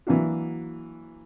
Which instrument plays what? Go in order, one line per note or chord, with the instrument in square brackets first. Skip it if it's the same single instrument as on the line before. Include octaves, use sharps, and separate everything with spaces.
[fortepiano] E3 F#3 A#3 D4 F#4